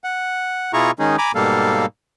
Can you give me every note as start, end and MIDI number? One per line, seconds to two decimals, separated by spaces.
0.04 0.72 78
0.73 0.91 47
0.73 0.91 64
0.73 0.91 65
0.73 0.91 68
0.73 0.91 82
0.73 0.91 85
0.99 1.16 51
0.99 1.16 56
0.99 1.16 61
0.99 1.16 63
0.99 1.16 68
1.18 1.32 80
1.18 1.32 82
1.18 1.32 83
1.18 1.32 86
1.35 1.86 44
1.35 1.86 47
1.35 1.86 55
1.35 1.86 58
1.35 1.86 69
1.35 1.86 77